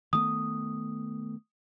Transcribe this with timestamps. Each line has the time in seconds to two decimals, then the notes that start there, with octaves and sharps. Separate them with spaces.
0.13 D#3 A3 B3 D#6